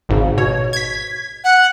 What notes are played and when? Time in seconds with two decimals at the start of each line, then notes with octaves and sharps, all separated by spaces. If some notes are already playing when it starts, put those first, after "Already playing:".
0.09 G#1 G#2 C#3
0.38 B2 C#5
0.73 G#6 B6
1.44 F#5